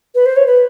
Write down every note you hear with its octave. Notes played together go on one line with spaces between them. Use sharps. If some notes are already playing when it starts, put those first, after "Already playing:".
B4
C5
C#5
B4